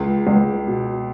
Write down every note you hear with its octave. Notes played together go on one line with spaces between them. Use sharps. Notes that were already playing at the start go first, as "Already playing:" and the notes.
Already playing: C#2
C#2
B2